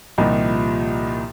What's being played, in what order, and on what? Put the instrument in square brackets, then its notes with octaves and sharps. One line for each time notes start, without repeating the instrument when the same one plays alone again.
[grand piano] C2 A#2 D#3 F3